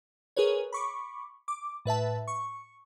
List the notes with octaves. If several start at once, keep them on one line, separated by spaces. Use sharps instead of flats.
G#4 A#4 B4 C#5
B5 C#6 D6
D6
A2 B4 E5 A5
C#6